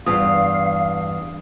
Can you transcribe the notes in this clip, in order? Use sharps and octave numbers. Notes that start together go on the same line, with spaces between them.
E2 G2 F5 D#6